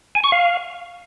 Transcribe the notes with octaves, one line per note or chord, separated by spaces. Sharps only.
G#5
C#6
F5